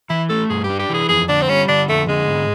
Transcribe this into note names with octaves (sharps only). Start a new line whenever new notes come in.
E3 E4
A3 A4
G2 G#4
G4
D4
G4
E3 G#4
F2 G#4
D3 D4
C4
G3 C#4
D3 D4
F2 A3
D3 G#3
G#2